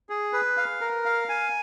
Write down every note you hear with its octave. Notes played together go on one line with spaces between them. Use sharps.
G#4
B4
F5
A#4
F5
G#5